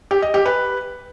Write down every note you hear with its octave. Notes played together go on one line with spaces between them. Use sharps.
G4
D#5
G4
B4